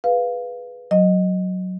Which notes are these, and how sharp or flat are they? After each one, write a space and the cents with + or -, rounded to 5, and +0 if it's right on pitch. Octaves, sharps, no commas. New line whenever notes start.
G#4 +10 B4 +0 F5 +0
F#3 +0 D#5 -5